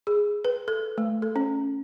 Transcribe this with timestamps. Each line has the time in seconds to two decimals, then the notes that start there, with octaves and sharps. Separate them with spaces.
0.07 G#4
0.45 B4
0.68 A4
0.98 A3
1.22 A4
1.36 C#4